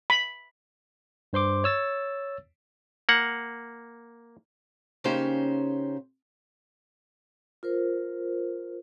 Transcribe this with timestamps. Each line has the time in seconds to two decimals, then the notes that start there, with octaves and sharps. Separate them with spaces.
0.10 B5
1.33 G2 C5 C6 D6
1.64 C#5 E6 A6
3.09 A#3 F#5
5.04 C#3 A#3 C#4 D#4 G4 C5
7.63 F4 A#4 C5